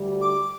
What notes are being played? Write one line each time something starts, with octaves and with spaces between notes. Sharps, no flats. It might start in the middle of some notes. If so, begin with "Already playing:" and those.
Already playing: D2 D3 G3
D6